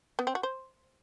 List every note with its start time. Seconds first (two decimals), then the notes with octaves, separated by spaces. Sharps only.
0.19 B3
0.27 C4
0.35 F#4
0.43 C5